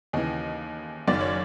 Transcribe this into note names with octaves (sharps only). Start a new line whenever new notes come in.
D#2 C#3 E3 D#5
F#1 F#2 D#3 D5
C#5